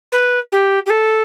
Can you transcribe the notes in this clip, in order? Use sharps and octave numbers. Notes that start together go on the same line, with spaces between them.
B4
G4
G4
A4